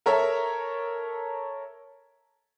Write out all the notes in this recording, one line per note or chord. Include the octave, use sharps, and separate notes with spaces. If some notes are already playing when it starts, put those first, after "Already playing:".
A4 A#4 C#5 E5